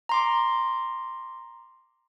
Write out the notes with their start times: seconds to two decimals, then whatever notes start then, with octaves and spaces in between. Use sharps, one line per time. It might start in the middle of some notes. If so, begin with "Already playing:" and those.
0.09 A#5 C6 D6